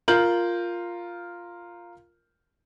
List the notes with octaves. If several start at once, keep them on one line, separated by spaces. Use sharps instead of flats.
F4 A#4 G6 F#7